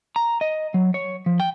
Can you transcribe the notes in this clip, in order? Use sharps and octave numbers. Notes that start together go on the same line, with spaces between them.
A#5
D#5
F#3
C#5
F3
G5